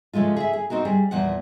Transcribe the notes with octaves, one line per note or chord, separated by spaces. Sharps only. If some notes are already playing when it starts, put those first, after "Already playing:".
C#3 F3 G#3 A3 F4
G#4 E5
G#4
C4 D#4 F#4 A#4
G3 G#4
E2 A#2 F3 F#5